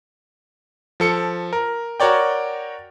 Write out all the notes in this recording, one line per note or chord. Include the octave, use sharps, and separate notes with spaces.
F3 A4 C#7
A#4
F#4 A#4 C#5 D5 G5